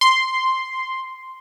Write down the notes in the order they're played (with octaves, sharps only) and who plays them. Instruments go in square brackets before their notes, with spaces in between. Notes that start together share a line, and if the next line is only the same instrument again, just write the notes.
[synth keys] C6